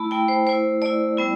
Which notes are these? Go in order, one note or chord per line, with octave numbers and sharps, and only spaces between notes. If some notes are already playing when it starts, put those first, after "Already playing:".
Already playing: A3 E4 A5 B5
A3 E4 G5
C5
A3 E4 C5
A3 E4 D5
G3 B3 E4